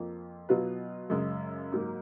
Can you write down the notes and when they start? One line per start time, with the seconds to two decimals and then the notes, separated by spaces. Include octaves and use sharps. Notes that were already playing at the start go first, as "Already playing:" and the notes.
Already playing: F2 F3 A#3 F4
0.49 B2 F#3 B3 F4 B4
1.10 F#2 C#3 G#3
1.72 G#2 F#3 A#3